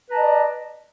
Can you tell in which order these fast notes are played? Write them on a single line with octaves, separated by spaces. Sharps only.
B4 A#5 A5 D#5 D5